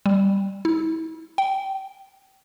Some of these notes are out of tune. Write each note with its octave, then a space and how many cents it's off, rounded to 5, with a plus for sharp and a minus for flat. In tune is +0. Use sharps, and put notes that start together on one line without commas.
G3 +0
E4 -35
G5 -25